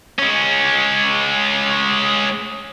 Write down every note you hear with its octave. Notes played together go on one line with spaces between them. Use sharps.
G#3 C#4